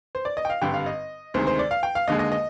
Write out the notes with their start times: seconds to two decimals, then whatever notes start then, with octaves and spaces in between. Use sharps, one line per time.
0.15 C5
0.25 D5
0.37 D#5
0.45 G5
0.50 F5
0.61 G#1 G2 D3 G3 G5
0.74 F5
0.86 D#5
1.34 D2 C3 D#3 G#3 C5
1.47 C5
1.59 D5
1.71 F5
1.83 G5
1.95 F5
2.07 D#2 D3 G#3 D#5
2.19 D#5
2.32 D#5